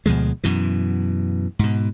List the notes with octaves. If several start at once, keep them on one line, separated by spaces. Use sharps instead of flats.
D2 B2 F3 G#3
F#2 B2 E3
G#2 B2